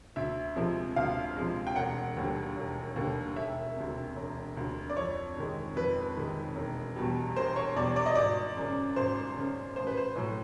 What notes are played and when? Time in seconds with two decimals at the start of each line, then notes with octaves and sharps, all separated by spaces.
0.16 D2 E5
0.56 C3 F3 G#3
0.96 D2 F5
1.36 C3 F3 G#3
1.67 G5
1.76 E1 F#5
2.17 D#2 D3 G3
2.57 E1
2.96 D#2 D3 G3
3.36 E1 E5
3.77 D2 C3
4.16 E1
4.56 D2 C3
4.90 D5
4.96 F2 C#5
5.37 C3 D#3 G#3
5.76 F2 B4
6.16 C3 D#3 G#3
6.56 E1
6.96 E2 B2 G3
7.36 E1 C5
7.56 C#5
7.76 E2 B2 G3 D5
7.96 D5
8.06 D#5
8.15 G#1 D5
8.57 F#2 C#3
8.96 G#1 C5
9.36 F#2 C#3
9.76 A1 C5
9.87 B4
9.97 C5
10.16 A2 F#3